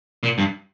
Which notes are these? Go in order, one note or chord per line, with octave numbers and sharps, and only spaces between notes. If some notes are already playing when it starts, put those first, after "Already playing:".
A#2
G2